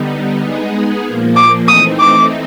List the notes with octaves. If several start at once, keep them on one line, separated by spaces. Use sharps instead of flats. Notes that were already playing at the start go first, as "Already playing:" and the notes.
Already playing: D3 G3 B3 D#4
G#3 B3 D#4 G#4
A#2 F3 A#3
D6
E3 A3 C4 D#4 D#6
D6